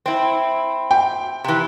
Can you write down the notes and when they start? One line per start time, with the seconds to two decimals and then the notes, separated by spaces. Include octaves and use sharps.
0.06 C4 E4
0.91 G5
1.44 C3 E3